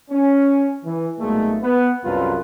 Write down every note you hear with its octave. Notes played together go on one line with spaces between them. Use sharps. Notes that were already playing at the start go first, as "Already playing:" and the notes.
C#4
E3
B1 A#2 G#3 A3
B3 B4
C2 F#2 F4 A4 B4